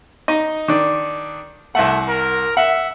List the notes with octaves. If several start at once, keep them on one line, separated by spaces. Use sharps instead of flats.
D#4 D#5
D#3 D4
C2 A3 F#5
A#4
E5 F#5